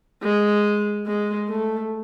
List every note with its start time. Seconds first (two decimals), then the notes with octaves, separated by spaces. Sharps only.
0.23 G#3
1.06 G#3
1.49 A3